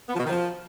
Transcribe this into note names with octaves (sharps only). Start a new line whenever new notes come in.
B3
F3
B2
D#3
F3